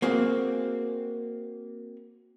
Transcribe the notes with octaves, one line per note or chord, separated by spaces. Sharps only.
A#3 C4 F#4 G#4